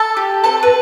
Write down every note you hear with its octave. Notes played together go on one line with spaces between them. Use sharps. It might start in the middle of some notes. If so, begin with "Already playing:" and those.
Already playing: A4 A5
G4
C4 A4 A5
B4